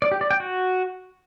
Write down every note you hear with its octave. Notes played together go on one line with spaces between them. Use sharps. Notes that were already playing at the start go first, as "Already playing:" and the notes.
D5
G4
D5
G5
F#4